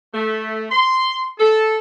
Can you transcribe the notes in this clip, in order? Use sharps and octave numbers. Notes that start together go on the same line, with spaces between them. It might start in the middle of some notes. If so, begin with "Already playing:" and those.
A3
C6
A4